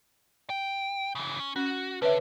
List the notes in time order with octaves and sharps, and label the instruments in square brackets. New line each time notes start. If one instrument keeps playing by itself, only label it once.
[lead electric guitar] G5
C#3 E3
C#4
[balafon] C#4 [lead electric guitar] F#4
[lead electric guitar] D3 [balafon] B4 C#5 E5